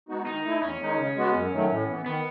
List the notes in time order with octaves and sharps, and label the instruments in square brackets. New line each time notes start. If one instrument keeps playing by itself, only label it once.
[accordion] G#3 B3 D#4 F#4
[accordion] D#3 [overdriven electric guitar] D#4
[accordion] A3 E4
[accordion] E2 [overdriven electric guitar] C#4
[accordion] D#3 G#3 D#4
C#3
G#3 B3 F#4
F#2
D#3 F#3 A3
A2
E3 B3
[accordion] D#3 [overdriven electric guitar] B3